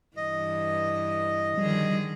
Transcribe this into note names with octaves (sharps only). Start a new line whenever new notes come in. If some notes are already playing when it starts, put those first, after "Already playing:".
G2 E3 D#5
D3 D#3 F3 G3 G#4